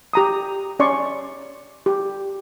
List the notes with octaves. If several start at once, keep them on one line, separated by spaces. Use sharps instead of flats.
G4 A#5 D#6
C#4 D5 C6 C#6
G4